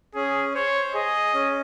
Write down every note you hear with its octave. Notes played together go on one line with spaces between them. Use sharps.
C#4 G#4
C5 C#5
G#4 D#5
C#4